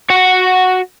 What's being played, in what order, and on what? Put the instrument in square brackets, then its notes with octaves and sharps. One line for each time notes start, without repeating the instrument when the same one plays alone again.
[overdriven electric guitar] F#4 F#5